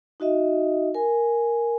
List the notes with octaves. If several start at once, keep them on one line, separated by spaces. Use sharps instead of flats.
D#4 F#4 D#5 E5
A#4 G#5